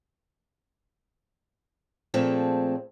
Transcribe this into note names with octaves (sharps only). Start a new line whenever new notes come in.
A#2 F3 A3 C4 G#4 A4